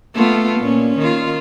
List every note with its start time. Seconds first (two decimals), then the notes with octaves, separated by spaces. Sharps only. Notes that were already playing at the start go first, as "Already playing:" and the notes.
0.15 A3 B3 F4
0.59 A#2 C#4
0.98 D#3 F4